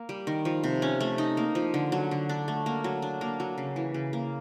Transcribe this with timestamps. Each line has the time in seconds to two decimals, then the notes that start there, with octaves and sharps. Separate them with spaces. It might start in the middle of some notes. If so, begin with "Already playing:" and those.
Already playing: A#3
0.09 G3
0.27 D#3
0.45 F3
0.64 C3
0.82 C#4
1.01 A3
1.18 D#4
1.37 A#3
1.55 F3
1.74 D3
1.92 F#3
2.11 D3
2.29 D4
2.48 A3
2.66 A#3
2.84 F#3
3.02 D4
3.21 A#3
3.40 F#3
3.58 C#3
3.76 E3
3.94 C#3
4.13 A#3